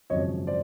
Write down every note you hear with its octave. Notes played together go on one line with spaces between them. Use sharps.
G#1 F#2 C#3 F3 C#5 D#5
C5 D5